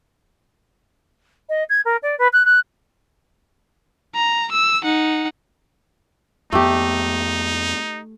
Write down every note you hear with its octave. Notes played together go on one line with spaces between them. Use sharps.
D#5
G#6
A#4
D5
B4
F#6
F#6
A#5
E6
D#4 F#5
F2 A3 B3 D#4 G4